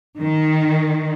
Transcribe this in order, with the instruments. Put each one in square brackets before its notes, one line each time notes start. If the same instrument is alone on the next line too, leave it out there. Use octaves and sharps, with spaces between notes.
[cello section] D#3